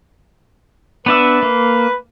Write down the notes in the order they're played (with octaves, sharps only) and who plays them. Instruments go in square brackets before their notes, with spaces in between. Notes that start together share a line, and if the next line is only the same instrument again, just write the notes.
[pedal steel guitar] B3 D4 E5 [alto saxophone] B4
[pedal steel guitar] A#3